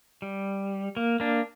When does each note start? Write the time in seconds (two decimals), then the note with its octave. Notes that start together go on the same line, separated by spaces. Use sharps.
0.22 G3
0.97 A#3
1.20 A#3 D4